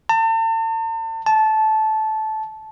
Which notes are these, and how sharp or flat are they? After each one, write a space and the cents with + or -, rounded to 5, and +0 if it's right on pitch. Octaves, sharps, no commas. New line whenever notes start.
A5 +40
A5 -15